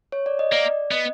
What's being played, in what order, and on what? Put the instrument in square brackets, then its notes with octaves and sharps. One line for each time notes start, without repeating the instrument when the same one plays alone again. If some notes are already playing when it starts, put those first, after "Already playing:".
[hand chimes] C#5
D5
D#5
[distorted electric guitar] A#3 [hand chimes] D5
[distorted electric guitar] B3 [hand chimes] D#5